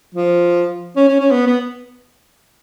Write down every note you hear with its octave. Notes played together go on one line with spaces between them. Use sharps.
F3
C#4
C#4
C#4
B3
B3